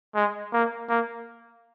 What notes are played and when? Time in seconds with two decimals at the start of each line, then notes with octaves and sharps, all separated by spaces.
0.15 G#3
0.53 A#3
0.89 A#3